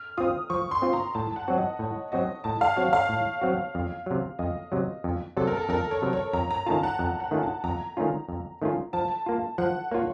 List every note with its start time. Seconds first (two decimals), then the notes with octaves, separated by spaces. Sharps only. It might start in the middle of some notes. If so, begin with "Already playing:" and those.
Already playing: F6
0.18 C4 F4 D#6
0.50 F3 C#6
0.71 C6
0.82 C4 F4
0.93 A#5
1.15 A2 A5
1.36 F#5
1.48 F#3 C4 F#4
1.58 D#5
1.79 A2 C#5
2.12 F#3 C4 F#4 D#5
2.44 A2 A5
2.61 F5
2.76 F#3 C4 F#4 C#5
2.93 F5
3.09 A2
3.41 F#3 C4 F#4
3.75 F2
4.06 C3 F#3
4.39 F2 D#5
4.72 C3 F#3
5.04 F2
5.37 C3 F#3 A4
5.47 A#4
5.57 A4
5.69 F2 A#4
5.91 C#5
6.02 C3 F#3
6.13 C#5
6.33 F2 A#5
6.51 A#5
6.66 D#3 A3 C#4 F4 A5
6.83 F#5
6.99 F2 F#5
7.20 F#5
7.31 D#3 A3 C#4 F4
7.43 A5
7.64 F2 A#5
7.97 D#3 A3 C#4 F4
8.29 F2
8.62 D#3 A3 C#4 F4
8.93 F3 A5
9.26 A#3 F4
9.58 F3 F#5
9.91 A#3 F4 C#5